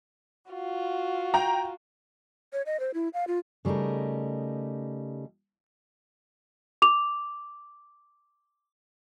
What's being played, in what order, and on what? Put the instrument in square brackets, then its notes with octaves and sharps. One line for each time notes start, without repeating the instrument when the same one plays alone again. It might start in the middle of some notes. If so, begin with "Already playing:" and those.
[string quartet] F4 F#4
[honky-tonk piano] G5 A#5
[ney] C#5
D#5
C5
E4
F5
F4
[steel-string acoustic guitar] C#3 G3 A3 D#4 A#4
[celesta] D6 F7